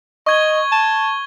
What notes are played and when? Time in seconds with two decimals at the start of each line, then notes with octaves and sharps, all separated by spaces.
0.26 D#5 C#6 G#6 G7
0.72 A5